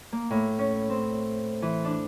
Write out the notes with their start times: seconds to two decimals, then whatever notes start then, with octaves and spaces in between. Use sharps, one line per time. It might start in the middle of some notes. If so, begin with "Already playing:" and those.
0.12 A#3
0.31 A2
0.59 C#4
0.90 C4
1.62 E3
1.85 D4